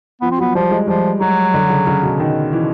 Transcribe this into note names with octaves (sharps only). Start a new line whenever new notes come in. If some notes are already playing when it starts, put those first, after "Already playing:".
F3 B3
C4
F#3 B3
F3 G3
G#3
F3 G3
F#3 G#3
D3
C#3
C#3
B2
D#3
E3